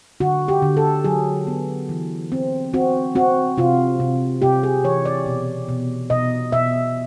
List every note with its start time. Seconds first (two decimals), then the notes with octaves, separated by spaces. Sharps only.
0.20 D3 F#4
0.48 G4
0.62 D3
0.77 A4
1.04 F#3 G#4
1.47 B3
1.89 E3
2.32 C4
2.73 C4 F#4
3.15 C4 F#4
3.58 C3 F4
4.00 C3
4.42 C3 G4
4.63 G#4
4.84 E3 C#5
5.05 D5
5.26 B2
5.68 B2
6.10 B2 D#5
6.52 B2 E5